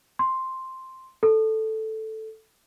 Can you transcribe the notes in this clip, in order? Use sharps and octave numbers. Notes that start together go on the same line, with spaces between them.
C6
A4